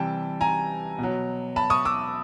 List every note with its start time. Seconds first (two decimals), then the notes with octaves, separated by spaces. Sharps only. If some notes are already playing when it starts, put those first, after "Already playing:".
Already playing: C3 E3 G3 G5 A5
0.41 G#5 A#5
0.98 B2
1.03 F#3
1.56 A5 B5
1.70 C#6 D#6
1.85 D6 E6